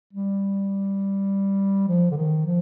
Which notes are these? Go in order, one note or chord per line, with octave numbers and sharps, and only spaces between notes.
G3
F3
D3
D#3
F3